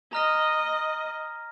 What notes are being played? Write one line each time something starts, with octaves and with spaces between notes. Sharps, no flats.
D#5 A#5 F6 A#6